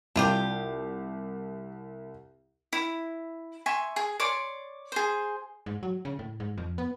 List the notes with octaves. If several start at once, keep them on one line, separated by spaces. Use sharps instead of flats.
C2 D4 F4 G4
E4
E5 G#5 C6 C#6
G#4
C#5 D5 C6
G#4 C5
G#2
F#3
C#3
A2
G#2
F2
B3